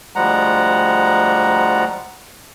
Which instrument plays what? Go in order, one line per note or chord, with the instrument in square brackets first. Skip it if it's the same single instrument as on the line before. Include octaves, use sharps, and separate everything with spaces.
[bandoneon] D2 F3 G3 G#3 F#5 A#5